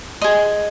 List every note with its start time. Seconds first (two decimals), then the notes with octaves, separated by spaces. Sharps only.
0.21 G#4 D#5 C6